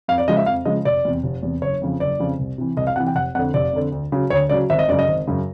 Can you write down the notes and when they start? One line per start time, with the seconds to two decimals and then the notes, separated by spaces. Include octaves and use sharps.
0.08 F2 F5
0.18 D5
0.28 C#3 F3 G#3 D#5
0.37 E5
0.46 F2 F5
0.65 C#3 F3 G#3 D#5
0.85 F1 D5
1.05 E2 C3
1.23 F1
1.43 E2 C3
1.62 F#1 C#5
1.81 F2 C#3 F3
2.00 F#1 D5
2.19 F2 C#3 F3
2.39 C2
2.58 C3 E3
2.77 C2 D#5
2.87 F5
2.96 C3 E3 F#5
3.07 G5
3.15 F1 F#5
3.35 F2 F#5
3.39 D3
3.54 F1 D5
3.73 F2 D3
3.92 D2
4.12 C#3 F#3
4.30 D2 C#5
4.49 C#3 F#3 D5
4.70 G#1 E5
4.79 D#5
4.88 F#2 C#3 D5
4.99 D#5
5.08 G#1
5.27 F#2 C#3